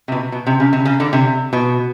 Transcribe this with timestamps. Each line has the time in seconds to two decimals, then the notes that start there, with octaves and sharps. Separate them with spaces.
0.08 C3
0.12 B2
0.32 B2
0.47 C3
0.60 C#3
0.73 C3
0.85 C#3
1.00 D3
1.13 C3
1.53 B2